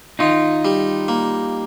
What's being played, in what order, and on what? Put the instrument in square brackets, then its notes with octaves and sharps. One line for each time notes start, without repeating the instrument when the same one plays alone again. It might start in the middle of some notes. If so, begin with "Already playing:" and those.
[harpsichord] D#3 [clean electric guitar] D#4 F4
[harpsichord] G3
A#3